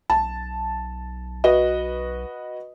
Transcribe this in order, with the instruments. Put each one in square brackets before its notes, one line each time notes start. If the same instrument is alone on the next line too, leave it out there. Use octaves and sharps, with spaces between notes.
[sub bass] B1 [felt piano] A5
[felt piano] F#4 B4 D#5